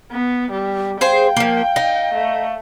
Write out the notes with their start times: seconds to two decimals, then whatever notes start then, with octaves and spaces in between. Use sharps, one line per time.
0.11 B3
0.52 G3
1.01 G#4 C5 F5 G5
1.36 F3 A#3
1.76 D#4
2.14 A3